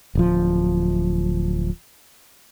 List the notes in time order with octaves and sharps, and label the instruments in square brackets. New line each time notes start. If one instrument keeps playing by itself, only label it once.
[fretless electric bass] D1 F3